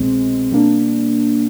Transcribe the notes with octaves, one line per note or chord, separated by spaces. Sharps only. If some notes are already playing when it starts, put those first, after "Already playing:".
Already playing: C2 B2 G#3 C4
B2 G3 A#3 D4